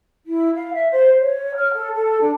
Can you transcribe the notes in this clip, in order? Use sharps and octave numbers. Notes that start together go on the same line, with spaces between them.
E4
F5
E5
C5
C#5
F6
A4
A4
D4